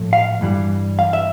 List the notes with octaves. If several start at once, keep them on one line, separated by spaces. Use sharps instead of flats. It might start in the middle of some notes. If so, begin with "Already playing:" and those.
Already playing: A2 F3 A3
F5
G2 E3 G3
F5
E5